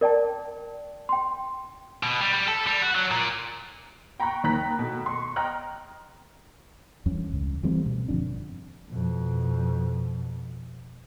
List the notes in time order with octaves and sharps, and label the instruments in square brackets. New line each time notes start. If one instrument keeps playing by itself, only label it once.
[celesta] A#4 D5 G5 A5
G5 C6
[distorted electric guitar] B2
G3
G3
A4
G3
F#4
F#3
A#2
[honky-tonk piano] G5 A#5 B5 C#6 F#6
D#2 D#3 A#3 A#5 F#6 B6
B2 A3
C6 C#6
D#5 G5 A#5 F6 F#6
[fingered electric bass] E2 G2 C#4
C#2
E3 G3 A3 C4
B2
G1 F2 D4
[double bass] F2 B2